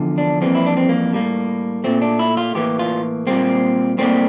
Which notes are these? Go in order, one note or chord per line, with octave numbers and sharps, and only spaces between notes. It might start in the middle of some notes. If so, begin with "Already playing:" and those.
Already playing: E2 D3 F3
D4
F2 E3 G3 A#3 C4
E4
D4
C4
A#3
A2 G3 A#3
A#2 A3 C4
D4
E4
F4
A2 E3 A#3 G4
F4
A#2 G3 A#3 C4
A2 G3 A#3 C4